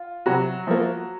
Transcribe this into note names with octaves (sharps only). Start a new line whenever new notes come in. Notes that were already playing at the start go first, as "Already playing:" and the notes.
Already playing: F4
C3 F#3 F#4
F3 A#3